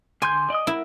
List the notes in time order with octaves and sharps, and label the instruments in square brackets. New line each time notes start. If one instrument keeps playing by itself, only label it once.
[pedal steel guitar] D3 C6 G6 [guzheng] G#5
[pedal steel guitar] D5 D#5 D#6
[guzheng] E4 [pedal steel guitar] A#4 F#5